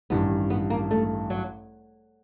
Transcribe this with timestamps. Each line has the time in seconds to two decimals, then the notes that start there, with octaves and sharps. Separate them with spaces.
0.10 A1 G2 D#3 B3
0.50 B3
0.70 A#3
0.91 A3
1.30 F#3